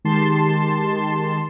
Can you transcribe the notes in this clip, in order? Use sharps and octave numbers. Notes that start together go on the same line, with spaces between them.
D#3 G#3 G4 A5 C6